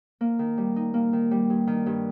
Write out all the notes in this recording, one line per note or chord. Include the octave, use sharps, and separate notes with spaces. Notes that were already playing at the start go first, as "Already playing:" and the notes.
A#3
D#3
G3
D#4
A#3
D#3
G3
G2
D#3
G2